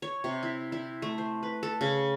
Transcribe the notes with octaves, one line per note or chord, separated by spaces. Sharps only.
C#5
C3
E4
E4
A3
C5
B4
A4
C#3